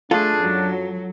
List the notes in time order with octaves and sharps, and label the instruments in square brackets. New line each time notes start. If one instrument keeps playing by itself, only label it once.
[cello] A3 G#4 [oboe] D4 [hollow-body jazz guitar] F4 A4
[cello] F#2 [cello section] F#3